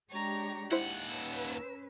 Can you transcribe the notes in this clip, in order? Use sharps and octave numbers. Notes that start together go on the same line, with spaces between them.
G#3 D4 G4 C#5 A#5
D#2 E4 C5 F#5 F#6
C#4 B4 E6